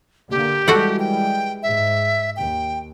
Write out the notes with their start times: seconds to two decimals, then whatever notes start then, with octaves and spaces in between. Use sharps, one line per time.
0.31 D3 A#3 G4
0.68 E3 G3 G#3 F#4 A4 F#5
0.99 G5
1.63 G#2 E5
2.37 D#2 G5